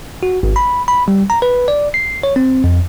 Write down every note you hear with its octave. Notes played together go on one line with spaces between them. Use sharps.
F#4
G#1
B5
B5
G3
A#5
B4
D5
C7
C#5
C4
F2